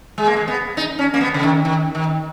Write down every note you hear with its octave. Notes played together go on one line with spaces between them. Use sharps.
G#3
A#3
G#3
B3
D#4
C#4
A#3
B3
C#3
D#3
D#3
D#3